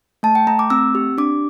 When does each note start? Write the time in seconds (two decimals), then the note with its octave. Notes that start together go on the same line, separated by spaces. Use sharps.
0.23 A3 A5
0.35 G5
0.47 A3 A#5
0.59 D6
0.70 C4 E6
0.95 G4
1.18 D4 D6